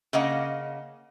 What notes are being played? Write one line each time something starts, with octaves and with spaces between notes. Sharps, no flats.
C#3 A#3 D#5 F#5